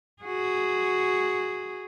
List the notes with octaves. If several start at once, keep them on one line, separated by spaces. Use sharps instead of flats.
F#4 G#4